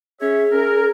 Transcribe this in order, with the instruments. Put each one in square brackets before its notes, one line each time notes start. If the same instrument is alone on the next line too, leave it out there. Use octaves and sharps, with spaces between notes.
[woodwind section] C#4 C#5 E5 [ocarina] G#4
[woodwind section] C#4 A#4